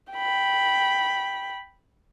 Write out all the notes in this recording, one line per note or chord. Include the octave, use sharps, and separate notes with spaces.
G5 B5